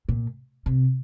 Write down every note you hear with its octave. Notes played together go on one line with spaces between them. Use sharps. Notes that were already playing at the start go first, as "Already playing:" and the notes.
A#2
C3